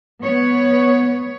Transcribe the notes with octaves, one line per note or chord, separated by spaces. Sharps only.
B3 C#5